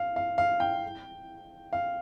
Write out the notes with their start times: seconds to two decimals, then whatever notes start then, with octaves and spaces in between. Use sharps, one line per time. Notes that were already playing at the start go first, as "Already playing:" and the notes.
Already playing: F5
0.16 F5
0.38 F5
0.60 G5
1.73 F5